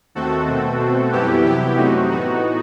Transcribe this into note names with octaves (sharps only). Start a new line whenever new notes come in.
D#2 D#3 A3 C4 F#4 A4
B2 A3 C4
B2 A3 C4
F#2 E3 G3 B3 E4 G4
C3 F#3 B3 E4 G4
F#2 F#3 A3 C4 D#4 F#4
A2 E3 B3 D#4 F#4